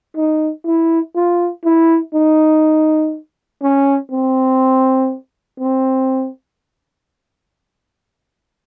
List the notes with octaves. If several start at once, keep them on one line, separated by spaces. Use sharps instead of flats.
D#4
E4
F4
E4
D#4
C#4
C4
C4